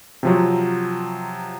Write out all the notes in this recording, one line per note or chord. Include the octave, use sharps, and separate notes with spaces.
C3 F3 F#3